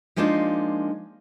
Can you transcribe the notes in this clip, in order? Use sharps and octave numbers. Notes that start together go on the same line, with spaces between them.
F3 G#3 A#3 D4 D#4 F4